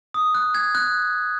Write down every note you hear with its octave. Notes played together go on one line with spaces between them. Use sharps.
D#6
F#6
G#6
F#6